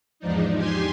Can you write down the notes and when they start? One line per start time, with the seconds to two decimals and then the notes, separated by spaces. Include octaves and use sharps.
0.20 E2 G#2 F3 D4 D#4
0.57 G4 G#5 C6